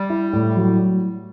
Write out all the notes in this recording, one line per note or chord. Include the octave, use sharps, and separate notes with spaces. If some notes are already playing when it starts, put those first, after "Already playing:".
Already playing: G3
E4
A2
F#3